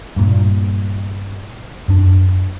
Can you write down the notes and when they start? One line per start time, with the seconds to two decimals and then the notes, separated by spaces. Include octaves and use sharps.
0.16 G2 A#2
1.88 F#2 D4